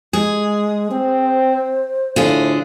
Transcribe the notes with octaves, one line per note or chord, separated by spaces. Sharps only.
G#3 G#4
C4 C5
A2 D3 F4 G#4